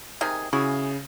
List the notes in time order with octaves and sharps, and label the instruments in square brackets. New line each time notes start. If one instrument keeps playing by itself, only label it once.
[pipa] C3 D#3 G#4
[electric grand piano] C#3 [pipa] E4 F#4 G#4